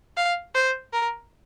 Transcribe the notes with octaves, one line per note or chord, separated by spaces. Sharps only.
F5
C5
A#4